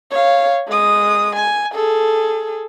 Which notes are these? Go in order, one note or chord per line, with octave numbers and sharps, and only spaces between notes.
C#5 F5
G#3 D#6
G#5
G#4 A4